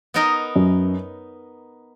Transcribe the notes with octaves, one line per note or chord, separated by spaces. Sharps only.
B3 D#4 A#4 D#5
F#2